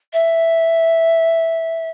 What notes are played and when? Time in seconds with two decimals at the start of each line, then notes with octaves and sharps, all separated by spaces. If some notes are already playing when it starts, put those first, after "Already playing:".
0.13 E5